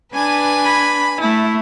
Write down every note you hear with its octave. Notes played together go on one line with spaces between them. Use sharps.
D4 B4 G#5
B5
A3 E4